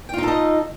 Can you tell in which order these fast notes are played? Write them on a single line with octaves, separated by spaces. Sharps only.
G5 F4 D#4 A4 D#5